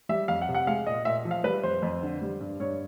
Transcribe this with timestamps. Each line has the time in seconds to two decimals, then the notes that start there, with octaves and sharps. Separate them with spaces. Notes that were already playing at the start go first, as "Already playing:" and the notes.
0.09 G3 E5
0.28 F2 F5
0.42 F#5
0.49 C3
0.55 F#5
0.67 G#3 F5
0.87 A#2 D#5
1.05 A#2 E5
1.25 F3
1.31 F5
1.44 G3 B4
1.63 F2 C5
1.82 F2
2.03 D3
2.22 G3
2.40 G2
2.60 G2 C#5